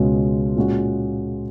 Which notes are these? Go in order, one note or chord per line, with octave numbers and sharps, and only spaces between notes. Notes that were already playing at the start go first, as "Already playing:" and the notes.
Already playing: C#2 B2 G#3 C#4
A#2 G#3 C#4 F#4